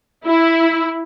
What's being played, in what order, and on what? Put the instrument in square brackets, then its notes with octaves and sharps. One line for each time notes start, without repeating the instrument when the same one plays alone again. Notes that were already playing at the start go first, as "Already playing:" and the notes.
[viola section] E4